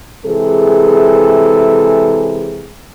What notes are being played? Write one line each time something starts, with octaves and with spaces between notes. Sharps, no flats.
C3 E3 G#3 G#4 A4